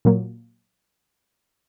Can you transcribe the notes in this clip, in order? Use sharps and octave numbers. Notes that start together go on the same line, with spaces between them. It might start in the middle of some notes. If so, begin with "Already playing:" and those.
A#2 F#3 A#3